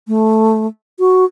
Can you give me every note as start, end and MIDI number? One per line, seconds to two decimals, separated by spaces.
0.08 0.67 57
0.99 1.25 66